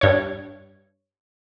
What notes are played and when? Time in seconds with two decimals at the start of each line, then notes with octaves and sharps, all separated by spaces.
0.01 G2 C#5